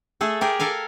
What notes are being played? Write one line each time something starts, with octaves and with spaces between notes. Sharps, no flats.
A3 G#4 A4
G4 G#4 A#4
A4 A#4 F5 G#5